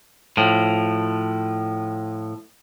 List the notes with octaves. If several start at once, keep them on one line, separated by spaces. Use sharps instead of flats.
A2 F3